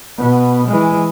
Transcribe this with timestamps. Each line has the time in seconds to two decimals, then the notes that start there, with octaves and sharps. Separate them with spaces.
0.18 B2 B3
0.68 E3 G#3